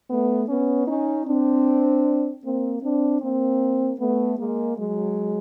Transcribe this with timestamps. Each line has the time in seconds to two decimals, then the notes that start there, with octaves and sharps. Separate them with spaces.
0.10 A3 B3
0.48 B3 C#4
0.87 C#4 D#4
1.26 C4 D4
2.44 A#3 C4
2.82 C4 D4
3.21 A#3 C4
3.99 A3 B3
4.38 G#3 A#3
4.77 F#3 G#3